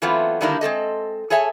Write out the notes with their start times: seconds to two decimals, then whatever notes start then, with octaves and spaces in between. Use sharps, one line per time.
0.02 E3 F#3 A3 B3 C4 F4
0.41 D3 D#3 G3 A#3 D4 E4
0.61 G#3 C4 A4 D#5
1.30 G#4 A4 C#5 E5 G#5 A5